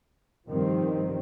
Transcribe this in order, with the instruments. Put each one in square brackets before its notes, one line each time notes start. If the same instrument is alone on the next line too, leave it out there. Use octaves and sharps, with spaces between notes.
[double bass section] G2 D#3 F3 G3 C4